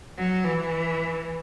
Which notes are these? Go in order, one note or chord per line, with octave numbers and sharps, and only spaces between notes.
F#3
E3